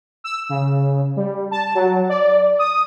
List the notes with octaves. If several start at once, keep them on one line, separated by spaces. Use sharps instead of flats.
E6
C#3
G3
A5
F#3
D5
D#6